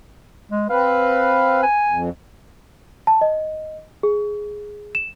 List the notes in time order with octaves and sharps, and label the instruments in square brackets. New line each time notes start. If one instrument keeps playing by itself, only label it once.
[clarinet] G#3
[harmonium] C4 B4 [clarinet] F5
[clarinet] G#5
[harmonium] F2
[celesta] A5
D#5
G#4
E7